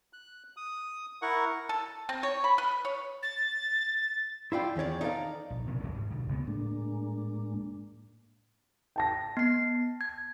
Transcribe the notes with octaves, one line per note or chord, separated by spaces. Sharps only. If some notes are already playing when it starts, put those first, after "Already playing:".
F#6
D#6
E4 A#4 F#5 C#6
A4
C4
C#5
B5
B4
C#5
A6
E4 F4 D5 G5
E2 D#3 C#4 C#5 D5
D#4 E4 A4 A#4 D5 F5
A#1
B1 A#2 C#3 C#4
D1 C2 G#3 C#4
G#2
B1 D3
F#1 C#2 A#2 B3
A2 G#3 A#3 D4
G5 A5 A#6
B3 C7
G#6